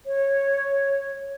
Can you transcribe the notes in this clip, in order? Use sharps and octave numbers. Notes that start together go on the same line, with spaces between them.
C#5